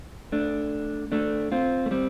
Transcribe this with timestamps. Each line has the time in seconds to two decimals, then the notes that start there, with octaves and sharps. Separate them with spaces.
0.32 A3 D4
1.12 A3 D4
1.52 C4 F4
1.86 A3
1.91 G3 C4